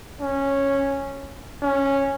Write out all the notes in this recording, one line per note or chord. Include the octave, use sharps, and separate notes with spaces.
C#4
C#4